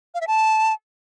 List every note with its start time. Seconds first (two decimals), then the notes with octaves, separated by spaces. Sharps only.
0.14 F5
0.21 E5
0.27 A5